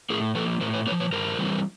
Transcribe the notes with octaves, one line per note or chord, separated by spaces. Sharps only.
A2 G#4 A#4
F3 A#3 A4 B4
A2 A#4 C5
B4 C#5
A#3 B4 C#5
F3
B4 C#5
G2 A#4 C5
E3 G3 C4